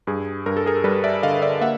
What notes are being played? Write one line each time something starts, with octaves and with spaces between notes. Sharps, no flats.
G2 G#4
G2 A#4
A4
G#4 A#4
G3 A4 B4
D5 E5
D3 D#5 F5
D5 E5
A#3 E5 F#5